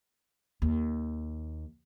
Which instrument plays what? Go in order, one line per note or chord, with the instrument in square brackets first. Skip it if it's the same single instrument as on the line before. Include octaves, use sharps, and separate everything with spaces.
[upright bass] D#2